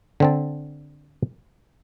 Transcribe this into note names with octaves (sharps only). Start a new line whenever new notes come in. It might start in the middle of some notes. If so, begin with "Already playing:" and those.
D3 C4 A5